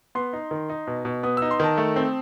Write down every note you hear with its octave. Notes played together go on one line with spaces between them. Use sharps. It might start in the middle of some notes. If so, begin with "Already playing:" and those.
B3 C6
D#4
D#3
D#4
B2
B2
B3 D#6
E6
D#4
C6
D#3 A5
A3
C4